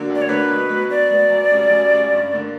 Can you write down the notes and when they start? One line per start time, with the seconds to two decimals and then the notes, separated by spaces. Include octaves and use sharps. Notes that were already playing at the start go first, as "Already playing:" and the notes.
Already playing: D3 F#3 A#3 D4
0.09 D2
0.15 D5
0.22 C#5
0.29 D3 F#3 A#3 D4 B4
0.50 B2
0.69 F#3 B3
0.89 B2 D5
1.11 F#3 B3
1.30 F#2
1.51 C#3 G3 C#4
1.71 F#2
1.91 C#3 G3 C#4
2.12 G2
2.32 D3 A#3